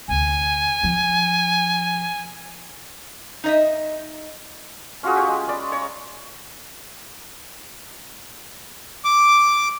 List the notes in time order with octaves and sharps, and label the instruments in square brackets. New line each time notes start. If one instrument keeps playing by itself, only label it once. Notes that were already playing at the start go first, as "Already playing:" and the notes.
[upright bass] D2 C3 [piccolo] G#5
[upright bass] F3
[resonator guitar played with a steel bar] D#4 D#5 E5
[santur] C#4 F4 F#4 G#4
G4 G#5 C#6
G#3
C#4 G#4 D5 B5
C#5 A#5
[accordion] D6